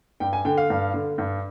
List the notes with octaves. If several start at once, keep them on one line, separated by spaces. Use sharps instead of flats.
G2 G5
G#5
D3 G5
F5
G2
D3
G2